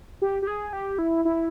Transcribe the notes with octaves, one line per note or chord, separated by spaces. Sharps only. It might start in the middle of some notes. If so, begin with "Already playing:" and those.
G4
G4
G#4
G4
E4
E4